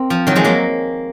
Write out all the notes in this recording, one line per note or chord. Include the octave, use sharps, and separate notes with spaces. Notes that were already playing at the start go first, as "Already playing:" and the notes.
Already playing: A#3 C4
F3
D#3 F#3
F3 G#3
F#3 A#3